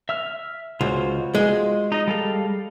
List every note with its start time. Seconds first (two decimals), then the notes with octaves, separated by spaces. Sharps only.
0.09 E5 E6 F6
0.81 C#2 F4 F#4 C5
1.35 G#3
1.92 D#4 D#5
2.07 G3 A4 F5